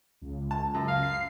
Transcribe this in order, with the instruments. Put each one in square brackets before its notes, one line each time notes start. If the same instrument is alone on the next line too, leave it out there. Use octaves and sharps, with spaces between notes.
[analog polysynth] C#2
[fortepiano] A5
F#2
[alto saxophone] F5
[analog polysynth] C7